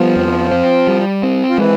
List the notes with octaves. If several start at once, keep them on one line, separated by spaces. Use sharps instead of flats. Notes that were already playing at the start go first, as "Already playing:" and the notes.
Already playing: F3 G3 B3
F2
C4
G3
C4
F3
E3 G#3